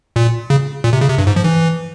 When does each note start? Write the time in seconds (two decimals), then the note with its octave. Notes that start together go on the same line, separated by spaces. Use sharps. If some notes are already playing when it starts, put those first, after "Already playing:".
0.16 A#2
0.50 C#3
0.84 A#2
0.93 C3
1.01 C#3
1.10 C3
1.18 G2
1.27 G#2
1.36 F3
1.44 E3